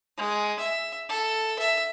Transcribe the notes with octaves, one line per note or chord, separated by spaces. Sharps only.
G#3
E5
A4
E5